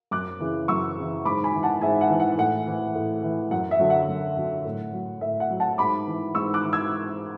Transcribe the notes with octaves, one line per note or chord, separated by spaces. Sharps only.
F#2 D6 F#6
C#3 E3
F#2 C#6 E6
C#3 E3
G#2 B5 D6
G#5 B5
E3
F#5 A5
G#2 E5 G#5
F#5
E3
F#5
A2 F#5
E3
A2
E3
F#2 F#5
E5
D3 F#3
F#5
F#2
D3 F#3
A2
F#3
A2 E5
F#5
F#3
F#5 A5
G#2 B5 D6
E3
G#2 C#6 E6
D6 F#6
E3
E6 G#6